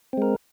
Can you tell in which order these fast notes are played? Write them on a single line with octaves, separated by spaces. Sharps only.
C4 G#3 A#4